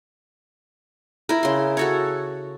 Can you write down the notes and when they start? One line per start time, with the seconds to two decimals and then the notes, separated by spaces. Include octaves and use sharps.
1.29 E4 A#4
1.43 C#3 C6
1.77 F#4 A4 C#5